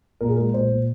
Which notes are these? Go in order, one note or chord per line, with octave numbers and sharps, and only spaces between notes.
A#2 A#4
G#4
G#3 A#4
A#2 C5
A#2